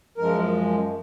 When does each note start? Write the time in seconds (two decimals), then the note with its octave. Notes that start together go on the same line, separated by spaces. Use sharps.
0.18 F#2 F3 G#3 A#4